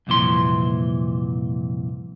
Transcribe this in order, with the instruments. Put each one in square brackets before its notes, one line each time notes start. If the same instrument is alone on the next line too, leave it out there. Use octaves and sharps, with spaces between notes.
[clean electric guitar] C2 F2 A#2 E3 C6